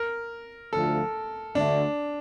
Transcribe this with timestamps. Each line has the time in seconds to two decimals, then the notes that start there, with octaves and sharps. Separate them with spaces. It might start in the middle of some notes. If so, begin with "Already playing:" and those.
Already playing: A#4
0.72 D2 D3 F3 A3 A4
1.55 D2 D3 A3 D4